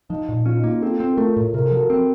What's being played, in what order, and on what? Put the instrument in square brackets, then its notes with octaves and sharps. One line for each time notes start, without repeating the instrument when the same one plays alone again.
[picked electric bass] F3 [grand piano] D#4
[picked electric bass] A#2
[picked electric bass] C#4 [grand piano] F4
[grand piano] D#4
[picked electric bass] A#3 [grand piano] F4
[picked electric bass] C4 [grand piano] F4 A4
[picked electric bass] C4
[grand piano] A#4
[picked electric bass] A3 [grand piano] F4 A4
[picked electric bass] A2
[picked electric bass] C3 [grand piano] A#4
[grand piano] A4
[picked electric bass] F3
[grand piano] F#4 A#4
[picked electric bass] C4